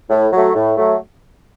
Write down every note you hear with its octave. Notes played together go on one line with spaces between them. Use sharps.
A2
F#3 A3
A2
F#3 A3